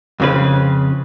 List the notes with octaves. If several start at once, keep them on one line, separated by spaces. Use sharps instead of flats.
F2 C#3 B4